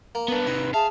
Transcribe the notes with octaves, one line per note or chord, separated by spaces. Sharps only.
A#3
B3 D4 B4
C3 D#3 F#5
G#4 E5 F5 A5